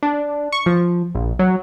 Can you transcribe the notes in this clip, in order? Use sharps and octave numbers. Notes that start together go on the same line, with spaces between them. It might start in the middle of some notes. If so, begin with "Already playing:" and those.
D4
C#6
F3
A#1
F#3